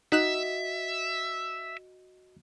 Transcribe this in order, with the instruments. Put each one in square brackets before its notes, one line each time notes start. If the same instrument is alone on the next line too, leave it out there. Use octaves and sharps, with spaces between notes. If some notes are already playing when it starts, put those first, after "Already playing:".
[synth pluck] D#4 F#6 E7 [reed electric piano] F#4 D#5 [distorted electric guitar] E5